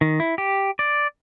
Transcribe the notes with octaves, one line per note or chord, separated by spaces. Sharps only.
D#3
E4
G4
D5